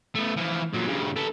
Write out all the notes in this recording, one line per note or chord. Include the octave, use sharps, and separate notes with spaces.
A3 B3
E3 F3
A#2 F#3
G2 C#3
A4 B4